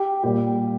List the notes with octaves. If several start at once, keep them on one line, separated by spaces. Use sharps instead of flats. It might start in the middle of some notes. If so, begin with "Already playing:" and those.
Already playing: G4
A#2 G3 G4